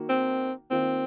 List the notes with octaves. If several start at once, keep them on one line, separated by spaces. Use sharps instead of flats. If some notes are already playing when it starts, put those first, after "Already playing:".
Already playing: D#3 A#3 F#4
C4
D#3 A#3 C4 F4